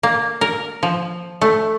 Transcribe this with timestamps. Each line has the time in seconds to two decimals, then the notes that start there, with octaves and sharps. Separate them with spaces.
0.03 A#3
0.41 A#4
0.83 F3
1.41 A3